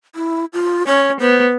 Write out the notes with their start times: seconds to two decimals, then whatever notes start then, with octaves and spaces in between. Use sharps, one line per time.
0.15 E4
0.53 F4
0.87 C#4 C#5
1.20 B3 C5